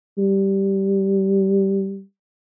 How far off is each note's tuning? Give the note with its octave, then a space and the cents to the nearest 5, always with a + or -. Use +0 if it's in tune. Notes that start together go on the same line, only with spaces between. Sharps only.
G3 -10